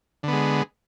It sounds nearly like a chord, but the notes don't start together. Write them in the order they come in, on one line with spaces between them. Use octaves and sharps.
D3 B3 G#3